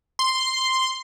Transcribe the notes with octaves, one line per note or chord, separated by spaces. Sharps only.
C6